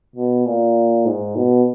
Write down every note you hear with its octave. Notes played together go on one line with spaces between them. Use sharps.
B2
A#2
G#2
B2